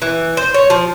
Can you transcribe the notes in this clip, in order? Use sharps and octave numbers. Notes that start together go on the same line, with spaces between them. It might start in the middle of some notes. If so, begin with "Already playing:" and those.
E3
C5
C#5
F3